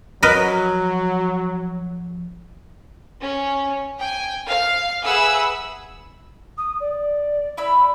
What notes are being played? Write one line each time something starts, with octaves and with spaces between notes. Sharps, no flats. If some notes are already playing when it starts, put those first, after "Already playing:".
F3 F#3 A#4 B4 D#5
C#4
G5 G#5
F5
G#4 B4 E5 F#5 B5 E6
D#6
D5
E4 B5 E6